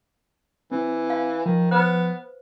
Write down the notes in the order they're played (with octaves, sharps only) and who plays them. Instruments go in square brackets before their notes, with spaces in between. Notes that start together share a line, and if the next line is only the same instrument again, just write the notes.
[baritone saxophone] E3 [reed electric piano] C4
[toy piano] F5
[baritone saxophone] D#3 [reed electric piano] F3
[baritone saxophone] B3 [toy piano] B4 C5